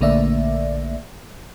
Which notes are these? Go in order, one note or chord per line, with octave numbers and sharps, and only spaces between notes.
A#1 D3 A3 A#3 D5 E5